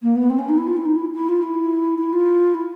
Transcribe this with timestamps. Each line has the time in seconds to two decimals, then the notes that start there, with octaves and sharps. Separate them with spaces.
0.02 A#3
0.15 B3
0.30 C4
0.38 C#4
0.48 D#4
0.57 E4
0.67 F4
0.76 E4
0.85 D#4
0.95 E4
1.14 E4
1.28 F4
1.42 E4
1.98 E4
2.12 F4
2.54 E4